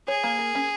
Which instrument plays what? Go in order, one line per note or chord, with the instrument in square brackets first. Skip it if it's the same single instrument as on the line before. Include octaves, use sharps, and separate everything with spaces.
[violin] G#4 [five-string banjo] C#5
[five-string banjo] A#3
A#4
C#4